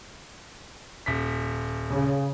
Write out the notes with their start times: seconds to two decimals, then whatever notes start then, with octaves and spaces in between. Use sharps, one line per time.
1.06 D#1 B6
1.91 C#3